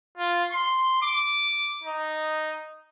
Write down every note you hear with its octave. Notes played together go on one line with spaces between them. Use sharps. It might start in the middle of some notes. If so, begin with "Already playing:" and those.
F4
C6
D6
D#4